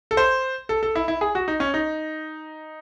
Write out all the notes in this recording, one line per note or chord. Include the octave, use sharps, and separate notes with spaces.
A4
C5
A4
A4
E4
E4
G#4
F#4
D#4
C#4
D#4